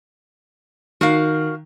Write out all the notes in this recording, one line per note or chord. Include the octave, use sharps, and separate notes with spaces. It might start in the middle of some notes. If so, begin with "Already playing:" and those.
D#3 F#4 A#4 F5